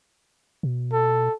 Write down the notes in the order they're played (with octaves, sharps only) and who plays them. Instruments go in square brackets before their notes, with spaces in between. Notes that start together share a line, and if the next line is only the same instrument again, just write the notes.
[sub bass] B2
[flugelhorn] A4